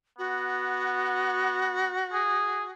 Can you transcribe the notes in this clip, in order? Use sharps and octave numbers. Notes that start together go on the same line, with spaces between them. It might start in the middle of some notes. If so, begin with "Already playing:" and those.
B3 F#4
G#4